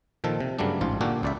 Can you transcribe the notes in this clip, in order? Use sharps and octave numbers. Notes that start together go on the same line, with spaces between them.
A#2 D#3 F3 A4
C3
G2 C#3 F#3 G3 A3 D4
A1 G#2 F4
A#2 D3 A#3 F#4 G4 A4
C#2 D5 E5